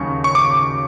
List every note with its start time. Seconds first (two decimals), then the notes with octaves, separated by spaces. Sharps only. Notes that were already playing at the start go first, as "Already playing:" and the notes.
Already playing: D#2 C#3 F#3 C#6
0.24 C#6
0.35 D6